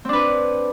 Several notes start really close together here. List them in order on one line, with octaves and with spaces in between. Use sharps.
C4 D4 B4